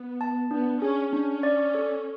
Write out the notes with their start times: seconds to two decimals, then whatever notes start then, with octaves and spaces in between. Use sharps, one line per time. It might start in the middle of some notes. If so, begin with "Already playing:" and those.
Already playing: B3
0.21 A5
0.51 B3 D4
0.82 C#4 G#4
1.13 C#4 D4
1.43 D5
1.75 A4